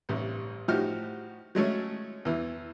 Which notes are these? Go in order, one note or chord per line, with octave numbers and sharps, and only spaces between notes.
A1 G2 C3 G3
A2 F3 D#4 F#4 G4 F6
F#3 G#3 A3 C#4
E2 E3